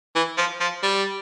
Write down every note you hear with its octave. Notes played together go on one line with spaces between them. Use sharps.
E3
F3
F3
G3